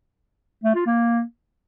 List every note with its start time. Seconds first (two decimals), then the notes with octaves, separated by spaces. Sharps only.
0.64 A3
0.75 F4
0.86 A#3